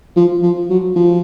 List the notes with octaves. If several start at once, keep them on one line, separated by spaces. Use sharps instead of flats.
F3
F3
F#3
F3